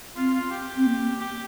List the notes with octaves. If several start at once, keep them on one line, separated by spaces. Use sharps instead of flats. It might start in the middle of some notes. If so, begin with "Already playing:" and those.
C4 F4
F4
G4
C4
A#3
G4